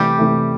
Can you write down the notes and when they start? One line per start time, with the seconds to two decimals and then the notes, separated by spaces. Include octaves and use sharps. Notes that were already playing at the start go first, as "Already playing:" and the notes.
Already playing: C3 E3 G3 A3 G4
0.19 C3 E3 A3